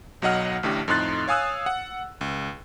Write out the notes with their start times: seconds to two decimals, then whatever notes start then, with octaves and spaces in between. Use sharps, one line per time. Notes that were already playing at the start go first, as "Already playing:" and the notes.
0.22 B1 F#3 D#5 F#5 F6
0.63 A1 A2 D3 G4
0.88 F2 A2 D#4 C6 F#6 A6
1.28 C#5 F5 G#5 D#6 E6 F#6
1.66 F#5
2.21 C#2